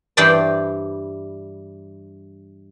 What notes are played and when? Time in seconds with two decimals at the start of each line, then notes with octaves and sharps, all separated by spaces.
0.17 G2 E3 C5 D5 G5 A5